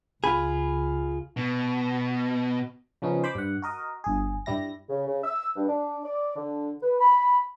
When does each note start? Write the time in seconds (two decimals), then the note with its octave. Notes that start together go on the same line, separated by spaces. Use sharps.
0.24 C#2 F4 G#4 B5
1.37 B2
3.02 C#3 F3 B3 C#4 D#4
3.24 C5 B5 D6
3.35 G2 F#5
3.62 F#4 A#4 D#5
4.04 G1 G#4
4.46 G2 G3 E4 A#6
4.90 C#3
5.07 C#3
5.24 E6
5.56 G2
5.69 D4
6.04 D5
6.36 D3
6.83 B4
7.01 B5